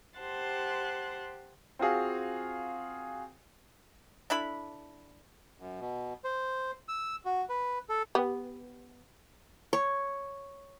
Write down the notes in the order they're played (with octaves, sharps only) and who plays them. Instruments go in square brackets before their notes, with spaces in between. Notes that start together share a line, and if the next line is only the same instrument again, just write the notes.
[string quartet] G4 C5 F#5 A5 C6
[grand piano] C4 F4 F#4 G#4 F5
[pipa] D4 E4 A4 B5
[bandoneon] F#2
B2
C5
E6
F#4
B4
A4
[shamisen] B3 [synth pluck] G4 B4
[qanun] C#5